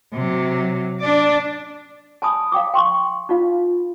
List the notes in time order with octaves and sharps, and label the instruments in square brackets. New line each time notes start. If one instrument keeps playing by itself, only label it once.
[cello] C3 F#3
D4 D5
[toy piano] G#5 A5 B5 D#6
F5 G5 D6
G5 C6 C#6
D#4 F4 F5